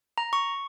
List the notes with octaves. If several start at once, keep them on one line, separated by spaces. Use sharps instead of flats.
A#5
C#6